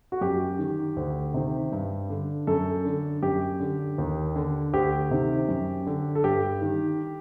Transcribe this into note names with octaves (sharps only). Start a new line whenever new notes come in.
F#4
F#2 G4
D#3
D2
C3 D#3
G2
D3
F#2 A4
D3
F#2 G4
D3
D#2
D3
D2 G4
C3 D#3
F#2
D3
A4
G2 G4
D#3